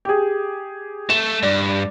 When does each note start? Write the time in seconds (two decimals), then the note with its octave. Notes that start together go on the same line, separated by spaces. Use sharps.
0.05 G4 G#4
1.10 A3 E7
1.43 G2 D5